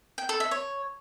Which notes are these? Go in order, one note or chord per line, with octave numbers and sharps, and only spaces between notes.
G5
A4
E5
C#5